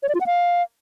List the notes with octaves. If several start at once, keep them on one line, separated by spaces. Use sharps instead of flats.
C#5
D5
F4
F#5
F5